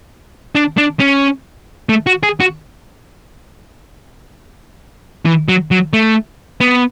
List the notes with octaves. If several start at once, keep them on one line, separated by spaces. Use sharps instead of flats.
D4
D4
C#4
A3
F#4
G#4
F#4
E3
F#3
F#3
A3
B3